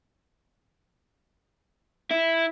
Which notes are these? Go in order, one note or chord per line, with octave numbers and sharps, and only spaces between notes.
E4